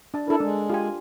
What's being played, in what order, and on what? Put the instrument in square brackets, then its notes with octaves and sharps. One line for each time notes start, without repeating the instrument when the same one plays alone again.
[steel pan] D4 A5
[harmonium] D4 E4 [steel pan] A4 A#4
[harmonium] G#3 [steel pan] D4
[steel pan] F4 G4 G#5